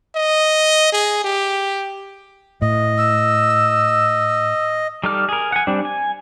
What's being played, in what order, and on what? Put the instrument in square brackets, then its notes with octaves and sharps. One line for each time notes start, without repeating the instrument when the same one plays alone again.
[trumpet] D#5
G#4
G4
[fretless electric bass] A2 [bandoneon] D#5
[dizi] E6
[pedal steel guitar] G3 D#4 A4 D6 F6
G#4 A#4
F#5 G#5
G3 C4 D4
G#5